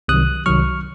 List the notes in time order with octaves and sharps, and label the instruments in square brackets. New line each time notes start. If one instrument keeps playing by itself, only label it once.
[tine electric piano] C2 C3 D#3 F#3 D#6 F#6
C2 C3 D#3 F#3 C#6 F6